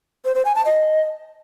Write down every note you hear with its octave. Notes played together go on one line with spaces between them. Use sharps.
C5
C5
G#5
A5
D#5